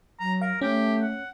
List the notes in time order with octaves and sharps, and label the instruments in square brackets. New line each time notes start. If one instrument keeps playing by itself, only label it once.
[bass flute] F#3 [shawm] A#5
[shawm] A#4 [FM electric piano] F5
[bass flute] A3 [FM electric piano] C#4 [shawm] G4
[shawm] F#5